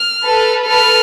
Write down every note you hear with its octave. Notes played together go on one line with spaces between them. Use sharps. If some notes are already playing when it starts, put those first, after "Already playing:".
Already playing: F6
A4 B4
A4 B4 F6